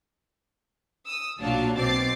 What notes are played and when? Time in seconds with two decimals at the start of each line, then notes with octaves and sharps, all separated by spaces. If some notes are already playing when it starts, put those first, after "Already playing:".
1.06 D#6 E6
1.39 B1 A#2 F#3 D4 F5 A5
1.76 B1 B2 C4 D6 A6 C7